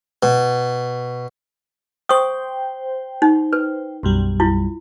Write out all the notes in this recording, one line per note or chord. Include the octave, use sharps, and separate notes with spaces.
B2
C5 G5 C#6 D#6
D#4
B4
B1 F#2 G3
E4 F4